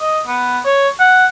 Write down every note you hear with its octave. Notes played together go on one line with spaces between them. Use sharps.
D#5
B3
C#5
F#5